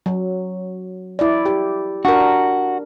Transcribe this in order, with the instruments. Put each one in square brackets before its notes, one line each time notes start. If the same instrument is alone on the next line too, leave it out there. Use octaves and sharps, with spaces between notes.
[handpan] F#3
E4 D5
G4
[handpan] D4 A#4 [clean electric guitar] F#4